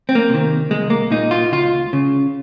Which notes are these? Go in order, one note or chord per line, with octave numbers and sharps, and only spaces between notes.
C4
A#3
C3 D#3
C2 G#3
A#3
A#2 D#4
F4
C#2 F4
C#3